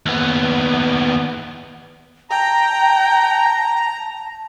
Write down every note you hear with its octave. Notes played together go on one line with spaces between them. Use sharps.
D#2 B3
G5 A5 A#5